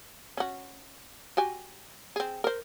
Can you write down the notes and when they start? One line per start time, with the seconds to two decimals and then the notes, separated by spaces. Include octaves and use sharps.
0.37 C#4 F#4
1.37 F#4 G4 G#5
2.16 C4 G#4
2.44 A#4 C5